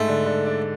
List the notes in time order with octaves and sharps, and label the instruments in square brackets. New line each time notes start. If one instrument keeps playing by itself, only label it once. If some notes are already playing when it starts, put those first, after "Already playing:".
Already playing: [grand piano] G#2 [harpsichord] A3
[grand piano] D3
D3
D4